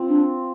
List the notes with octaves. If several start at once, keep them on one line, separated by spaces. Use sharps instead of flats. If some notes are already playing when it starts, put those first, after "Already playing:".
Already playing: C4 F4
D4